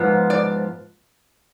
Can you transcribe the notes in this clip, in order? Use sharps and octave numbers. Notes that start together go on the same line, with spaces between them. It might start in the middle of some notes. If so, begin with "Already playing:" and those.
Already playing: G#2 F3 B3
D5